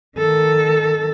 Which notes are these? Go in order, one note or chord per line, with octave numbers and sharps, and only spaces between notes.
D#3 A4